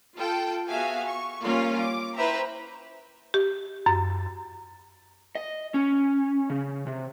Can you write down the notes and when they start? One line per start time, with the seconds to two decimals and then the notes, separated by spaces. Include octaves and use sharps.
0.17 F4 A4 G5
0.68 B3 F#4 G#4 E5 F5 G#5
1.05 C#6
1.43 G3 A#3 C#4 F4 F5
1.81 D6
2.15 E4 B4 C5 E5 G5 A#5
3.34 G4
3.86 F#2
5.35 D#5
5.74 C#4
6.50 C#3
6.87 C3